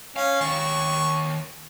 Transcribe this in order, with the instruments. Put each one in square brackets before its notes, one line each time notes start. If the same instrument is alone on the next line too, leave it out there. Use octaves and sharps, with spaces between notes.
[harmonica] C#4 [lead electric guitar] F5
[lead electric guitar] D#3 C#5 [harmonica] C#6